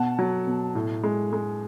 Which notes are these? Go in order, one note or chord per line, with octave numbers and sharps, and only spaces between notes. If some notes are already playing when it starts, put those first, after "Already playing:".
Already playing: B2 F#5 A5
F#3
B2
A2
G#3
G#3